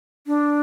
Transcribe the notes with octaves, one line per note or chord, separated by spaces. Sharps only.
D4